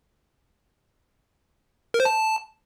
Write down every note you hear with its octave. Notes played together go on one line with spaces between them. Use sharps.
A#4
C5
A5